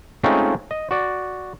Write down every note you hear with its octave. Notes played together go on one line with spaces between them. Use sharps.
G#3 A3 C4 C#4 D#4 F4
D#5
F#4 D5